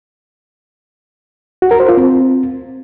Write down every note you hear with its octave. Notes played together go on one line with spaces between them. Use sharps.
F#4
A#4
C5
F4
C4